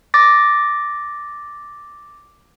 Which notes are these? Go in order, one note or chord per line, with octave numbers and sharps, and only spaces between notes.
D6 A6 A#6